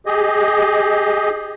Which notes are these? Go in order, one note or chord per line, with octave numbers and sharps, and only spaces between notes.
G4 G#4 D#5